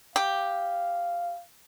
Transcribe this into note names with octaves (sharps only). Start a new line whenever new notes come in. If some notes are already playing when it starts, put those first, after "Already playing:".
G4 F5